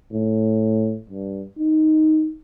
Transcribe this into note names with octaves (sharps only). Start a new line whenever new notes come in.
A2
G2
D#4